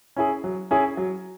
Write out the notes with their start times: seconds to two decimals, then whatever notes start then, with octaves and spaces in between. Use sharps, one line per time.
0.16 C#4 E4 G#4
0.44 F#3
0.71 C#4 E4 G#4
0.97 F#3